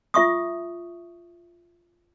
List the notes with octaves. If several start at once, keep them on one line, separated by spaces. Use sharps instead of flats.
F4 E5 C#6 D#6